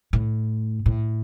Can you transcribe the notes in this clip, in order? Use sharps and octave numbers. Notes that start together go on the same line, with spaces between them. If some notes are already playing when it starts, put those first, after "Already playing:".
A2
A2